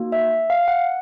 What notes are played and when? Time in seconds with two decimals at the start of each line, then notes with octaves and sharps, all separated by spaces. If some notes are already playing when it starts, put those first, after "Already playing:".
Already playing: A#3 D#4 F#4
0.12 E5
0.50 F5
0.68 F#5